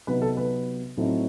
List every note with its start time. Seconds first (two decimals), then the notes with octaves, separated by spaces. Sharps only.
0.07 C3 F#3 B3 D#4 B4
0.22 A4
0.37 B4
0.97 A2 F#3 A3 C4 D#4